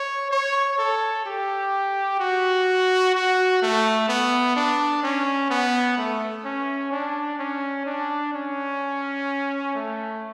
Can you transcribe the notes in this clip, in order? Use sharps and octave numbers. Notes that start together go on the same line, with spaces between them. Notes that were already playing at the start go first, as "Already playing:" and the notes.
Already playing: C#5
C#5
A4
G4
F#4
F#4
A3
B3
D4
C#4
B3
A3
C#4
D4
C#4
D4
C#4
A3